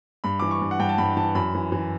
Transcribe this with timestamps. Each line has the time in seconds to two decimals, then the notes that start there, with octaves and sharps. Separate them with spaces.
0.24 G2 B5
0.40 E3 D6
0.51 C#6
0.61 G2
0.71 F#5
0.79 G2 G5
0.89 A5
0.98 G2 B5
1.17 E3 A5
1.35 F#2 B5
1.55 E3
1.72 E3